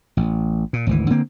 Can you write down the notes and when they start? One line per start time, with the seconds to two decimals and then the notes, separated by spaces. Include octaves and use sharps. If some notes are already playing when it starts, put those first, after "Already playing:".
0.17 A1
0.73 A#2
0.87 G#1 D2 E3
1.10 D3 A#3 C4